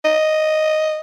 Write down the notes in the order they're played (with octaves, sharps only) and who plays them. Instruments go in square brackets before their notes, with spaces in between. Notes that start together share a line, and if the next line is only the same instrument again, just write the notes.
[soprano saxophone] D#5